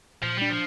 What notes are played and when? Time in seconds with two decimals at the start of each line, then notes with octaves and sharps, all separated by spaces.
0.23 A#2 F3
0.37 G3 D4
0.50 F3